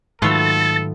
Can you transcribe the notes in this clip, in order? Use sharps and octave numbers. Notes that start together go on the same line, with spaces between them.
G#2 D#3 F#3 A3 B3 F4 A4 A6